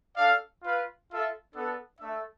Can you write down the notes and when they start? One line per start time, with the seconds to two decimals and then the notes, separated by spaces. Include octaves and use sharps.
0.16 D4 A4 D5 F5
0.62 F4 B4 F5
1.09 F4 A4 E5
1.54 B3 D4 A4
2.00 A3 D4 A4 E5